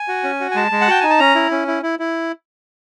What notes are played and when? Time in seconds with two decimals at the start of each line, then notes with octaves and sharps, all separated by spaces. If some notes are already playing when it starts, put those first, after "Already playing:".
Already playing: G#5
0.08 F#4
0.24 C#4
0.40 F#4
0.51 G#5
0.55 G#3 A5
0.72 G#3
0.81 F#5
0.88 F#4 G5
1.01 D#4 G#5
1.10 A5
1.19 C#4 A#5
1.35 E4
1.51 C#4
1.68 E4
1.83 E4
1.99 E4